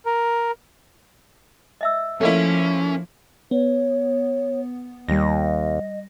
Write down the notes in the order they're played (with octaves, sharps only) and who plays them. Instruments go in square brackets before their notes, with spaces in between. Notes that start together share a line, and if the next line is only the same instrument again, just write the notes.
[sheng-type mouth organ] A#4
[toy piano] D#5 E5 E6
[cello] F3 [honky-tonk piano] A3 A#3 E4 [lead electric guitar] C#4
[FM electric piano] B3 [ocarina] C#5
[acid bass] D#2 [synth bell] G3 A#6 [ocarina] D#5